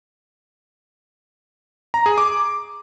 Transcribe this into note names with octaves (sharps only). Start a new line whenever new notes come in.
A#5
G#4
D6